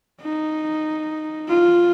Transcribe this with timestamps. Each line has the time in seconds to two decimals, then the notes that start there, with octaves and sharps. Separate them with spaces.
0.22 D#4
1.48 F4